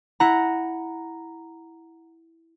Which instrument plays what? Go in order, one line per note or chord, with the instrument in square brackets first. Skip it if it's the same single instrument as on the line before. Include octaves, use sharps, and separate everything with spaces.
[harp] E4 F#5 A#5